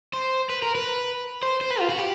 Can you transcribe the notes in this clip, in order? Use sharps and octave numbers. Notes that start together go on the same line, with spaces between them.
C5
B4
A#4
B4
C5
C5
B4
F4
F#4
G4